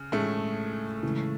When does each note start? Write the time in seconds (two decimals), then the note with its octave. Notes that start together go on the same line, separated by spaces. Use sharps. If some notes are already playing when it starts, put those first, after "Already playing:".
Already playing: C#3
0.12 A2 G#3 A3 C#4 G#4
1.03 C#3 E3 G#3